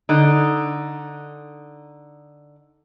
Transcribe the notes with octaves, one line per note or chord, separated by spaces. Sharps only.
D3 D#4